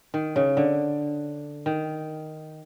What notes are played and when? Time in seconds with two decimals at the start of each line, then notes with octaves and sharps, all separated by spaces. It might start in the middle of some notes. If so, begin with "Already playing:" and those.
0.14 D#3
0.36 C#3
0.57 D3
1.66 D#3